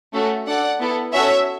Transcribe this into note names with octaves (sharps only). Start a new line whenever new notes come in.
A3 C#4 F#4 A4
D4 A4 D5 F#5
B3 E4 A4
C#4 F#4 A4 C#5 E5